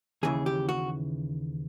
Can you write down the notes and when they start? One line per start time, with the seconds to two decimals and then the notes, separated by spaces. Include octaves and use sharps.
0.23 D#2 C#3 E3 G#4
0.46 G4
0.69 F#4